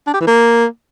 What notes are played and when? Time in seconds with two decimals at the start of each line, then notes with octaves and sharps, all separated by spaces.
0.07 D4
0.14 G4
0.20 E3
0.27 A#3